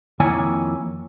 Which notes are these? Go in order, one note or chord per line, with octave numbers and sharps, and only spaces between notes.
F2 D#3 A#3 E4 C#5 G#5